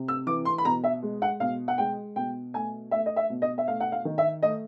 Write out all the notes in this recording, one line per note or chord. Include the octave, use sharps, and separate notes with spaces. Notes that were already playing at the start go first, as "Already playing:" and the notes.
Already playing: C3
E6
E3 D6
C6
B5
B2 A#5
E5
G#3
F#5
B2 F5
F#5
G#3 G5
B2 G5
A3 G#5
A3 E5
D#5
E5
B2
D#5
E5
A3 F5
F#5
F5
D#3
E5
A3 D#5